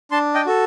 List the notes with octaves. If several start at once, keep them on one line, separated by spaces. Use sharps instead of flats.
D4 A5 C6
D#5 G5
F#4 A4